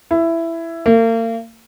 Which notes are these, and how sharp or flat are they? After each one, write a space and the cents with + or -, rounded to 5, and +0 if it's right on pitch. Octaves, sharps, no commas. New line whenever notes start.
E4 +10
A#3 -40